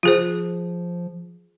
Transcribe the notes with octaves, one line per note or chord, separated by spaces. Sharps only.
F3 F4 G#4 C5